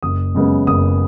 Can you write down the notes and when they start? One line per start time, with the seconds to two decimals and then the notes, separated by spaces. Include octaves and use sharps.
0.03 F#1 D#6
0.35 F#2 C#3 G#3 B3
0.67 F#1 D#6